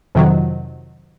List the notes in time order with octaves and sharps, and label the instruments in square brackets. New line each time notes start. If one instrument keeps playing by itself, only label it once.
[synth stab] F2 C3 D#3 F#3